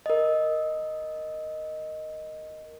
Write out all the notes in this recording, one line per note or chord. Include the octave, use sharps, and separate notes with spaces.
A#4 D#5